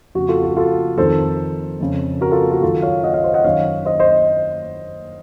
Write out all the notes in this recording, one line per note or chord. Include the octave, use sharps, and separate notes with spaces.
F2 C#3 F#4
F4 A4
F#4
F4 A4
F2 D#3 A4 C5
F2 C#3
F#4 A#4
F4 A4
F#4
F#2 D#3 F4 A4
C#5 F5
D#5 F#5
C#5 F5
C5 D#5
D#5 F#5
F#2 D#3 C#5 F5
C5 D#5
C5 D#5